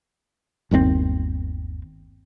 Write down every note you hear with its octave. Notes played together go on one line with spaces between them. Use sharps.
G1 D#2 D3 C4